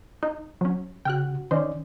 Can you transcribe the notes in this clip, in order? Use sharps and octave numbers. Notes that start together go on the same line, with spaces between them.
D#4
F#3 C#4
C#3 F#4 G5 F6 F#6
D#3 C#4 C5 D5 D#5